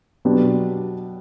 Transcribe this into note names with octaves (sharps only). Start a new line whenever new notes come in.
B2 F#3 B3 D4 G4